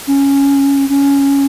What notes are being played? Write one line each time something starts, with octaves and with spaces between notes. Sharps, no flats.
C#4
C#4